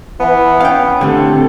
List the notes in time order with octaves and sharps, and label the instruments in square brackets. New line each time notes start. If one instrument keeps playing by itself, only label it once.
[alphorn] E3 [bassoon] B3
[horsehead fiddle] C#4 [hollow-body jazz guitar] F5 G5
[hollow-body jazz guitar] A2 D3 [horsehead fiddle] C4 A4 [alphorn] G4